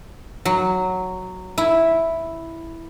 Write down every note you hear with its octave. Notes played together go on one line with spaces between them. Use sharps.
F#3
E4